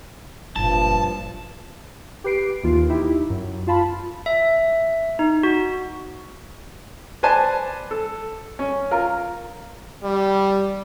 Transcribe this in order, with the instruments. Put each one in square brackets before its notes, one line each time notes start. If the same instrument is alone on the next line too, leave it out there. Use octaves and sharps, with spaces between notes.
[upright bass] F#1 A#2 [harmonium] G2 F3 [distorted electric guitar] A5
[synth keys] G4 B4 C7 D7
D#2 E3 F4
D#4 E4 G4
F#2
F4 F5 A5 B5
[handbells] E5
D#4
F#4
[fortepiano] B4 C5 D5 G#5 A5
A4
C#4
F4 A#4
[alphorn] G3